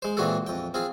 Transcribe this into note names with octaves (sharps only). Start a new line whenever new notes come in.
G#3 C5
A#2 E3 C4 F#4 G#4 A4
F2 G5
C4 F4 G#4